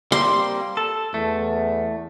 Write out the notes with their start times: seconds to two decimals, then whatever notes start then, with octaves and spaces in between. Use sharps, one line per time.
0.12 G3 A#3 C4 C6
0.77 A4
1.14 E2 A3